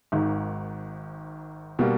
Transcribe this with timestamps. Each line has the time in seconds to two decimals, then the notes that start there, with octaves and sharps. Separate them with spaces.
0.12 G#1 G#2 D#3
1.79 B2 G3 A#3